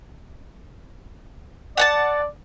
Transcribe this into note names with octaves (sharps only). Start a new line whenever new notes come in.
D5 F#5 G#5 A5